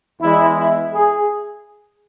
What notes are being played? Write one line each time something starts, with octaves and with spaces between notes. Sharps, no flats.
E2 E3 G#3 E4
E4
G#4